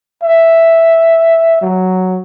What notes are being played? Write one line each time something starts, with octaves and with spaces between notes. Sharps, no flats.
E5
F#3